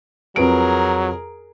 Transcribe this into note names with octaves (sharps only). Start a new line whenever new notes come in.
F2 F#3 G#4 A#4 B4 D7